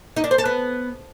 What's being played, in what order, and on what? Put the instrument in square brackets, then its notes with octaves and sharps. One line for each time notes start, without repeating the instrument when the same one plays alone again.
[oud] D#4
D4
C5
A4
B3